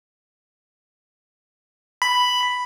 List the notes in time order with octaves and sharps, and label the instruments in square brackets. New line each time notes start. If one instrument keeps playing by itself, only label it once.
[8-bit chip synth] B5